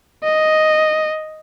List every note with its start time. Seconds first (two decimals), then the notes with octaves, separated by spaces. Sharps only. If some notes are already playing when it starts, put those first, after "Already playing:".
0.24 D#5